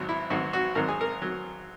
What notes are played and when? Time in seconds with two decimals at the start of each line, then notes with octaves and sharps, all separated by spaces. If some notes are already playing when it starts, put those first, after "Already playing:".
Already playing: G#1 G#2 F#3
0.09 E4
0.30 G#1 G#2 F#3 F#4
0.53 F#4
0.75 G#1 G#2 F#3 A#4
0.89 G#4
1.01 A#4
1.22 F#3